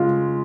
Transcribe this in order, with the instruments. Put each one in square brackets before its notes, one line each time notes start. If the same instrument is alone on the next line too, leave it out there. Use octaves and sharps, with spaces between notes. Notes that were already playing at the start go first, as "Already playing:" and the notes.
Already playing: [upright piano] C#3 G#3 [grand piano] F4